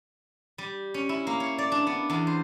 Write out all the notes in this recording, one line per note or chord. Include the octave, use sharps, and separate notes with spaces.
G3
C#4
E4
A#3
C#5
D5
D4
B3
E2
C5